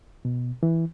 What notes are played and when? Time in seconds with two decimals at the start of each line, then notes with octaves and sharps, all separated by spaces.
0.25 B2
0.63 E3